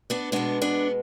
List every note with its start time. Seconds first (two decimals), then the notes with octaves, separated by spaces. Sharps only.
0.10 B3 D4
0.32 B2 G#3 B3 D4
0.62 B3 D4